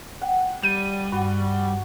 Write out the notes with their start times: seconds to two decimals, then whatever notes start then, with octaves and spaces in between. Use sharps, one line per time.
0.22 F#5 G5
0.63 G3 G6 D#7
1.12 G2 F#4